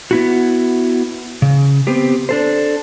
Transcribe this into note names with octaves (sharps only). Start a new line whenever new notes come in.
B3 E4 F#4
C#3
B3 C4 G4
D4 A4 C5